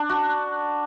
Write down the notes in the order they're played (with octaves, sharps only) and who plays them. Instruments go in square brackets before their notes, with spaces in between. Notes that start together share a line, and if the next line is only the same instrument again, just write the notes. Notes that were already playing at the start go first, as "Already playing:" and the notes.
Already playing: [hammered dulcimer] D4
F#4